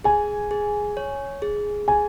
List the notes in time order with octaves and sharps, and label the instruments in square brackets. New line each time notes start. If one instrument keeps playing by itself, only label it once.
[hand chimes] G#4 [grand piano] G#5
[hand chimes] G#4
C#5
G#4
[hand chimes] G#4 [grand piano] G#5